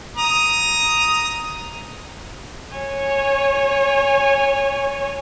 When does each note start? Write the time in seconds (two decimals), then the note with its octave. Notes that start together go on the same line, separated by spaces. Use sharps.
0.17 A#5 D#6
2.75 C#5 G#5